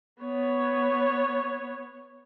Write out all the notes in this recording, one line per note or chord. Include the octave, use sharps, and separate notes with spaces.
B3 C#5